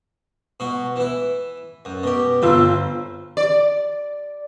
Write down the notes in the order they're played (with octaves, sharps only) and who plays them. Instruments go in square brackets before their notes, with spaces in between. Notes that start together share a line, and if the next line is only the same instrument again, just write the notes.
[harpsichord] B2 F#4
E3 E4
F#2
B2 G4
[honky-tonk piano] G1 F4 E6 [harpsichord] C4
[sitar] D5